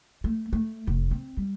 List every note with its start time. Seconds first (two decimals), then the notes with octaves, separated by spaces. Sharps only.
0.24 A3
0.53 A3
0.87 F1
1.11 C4
1.37 G3